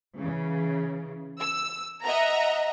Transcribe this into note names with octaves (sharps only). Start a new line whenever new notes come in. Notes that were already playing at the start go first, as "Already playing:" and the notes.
C#3 E3
E6
D#5 E5 F#5 A#5